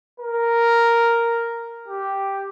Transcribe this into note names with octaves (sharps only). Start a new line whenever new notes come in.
A#4
G4